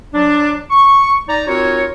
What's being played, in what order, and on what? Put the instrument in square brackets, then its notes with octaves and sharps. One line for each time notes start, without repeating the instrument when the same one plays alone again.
[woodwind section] F#3 D4
C#6
D#4 D5 A#5
C4 D#4 F4 F#4 A#4 C#5